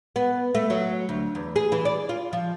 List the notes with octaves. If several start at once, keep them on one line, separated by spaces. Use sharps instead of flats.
B3
A3
F#3
D2
E2
G#4
E3
D5
F4
F3